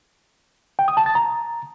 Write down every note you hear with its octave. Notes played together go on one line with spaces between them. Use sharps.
G5
D#6
A5
A6
A#5